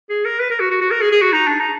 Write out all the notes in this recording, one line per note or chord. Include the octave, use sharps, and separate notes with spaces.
G#4
A#4
B4
A#4
F#4
F#4
F#4
A#4
G#4
G#4
F#4
D#4
D4
D#4